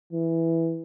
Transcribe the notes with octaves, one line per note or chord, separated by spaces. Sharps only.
E3